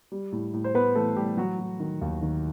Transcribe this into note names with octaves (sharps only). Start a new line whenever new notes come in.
G3
A2
A2
C5
A2 B3 B4
E3 A3 A4
A2 G3 G4
F#3 F#4
F#3
D#3
D#2
D#3